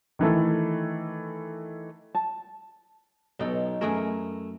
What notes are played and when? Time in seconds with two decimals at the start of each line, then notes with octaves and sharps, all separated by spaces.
0.19 D#3 E3 A3 A4
2.15 A5
3.40 B1 B2 D#4 A4
3.81 F#2 A3 E4 G#4 A#4